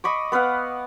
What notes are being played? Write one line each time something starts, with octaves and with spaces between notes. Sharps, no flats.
D#5 B5 C#6 D6
B3 B4 F5 F#5